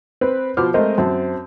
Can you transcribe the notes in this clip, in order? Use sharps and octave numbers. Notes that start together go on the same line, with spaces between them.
C4 B4
B2 F3 C5 D6 F6
G#3 A3 C4 A#4 C5 D#5
F#2 C4 A5